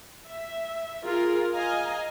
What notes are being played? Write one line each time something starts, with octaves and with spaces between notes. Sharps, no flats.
E5
F4 G#4 A#4
D#5 F5 G#5 A#5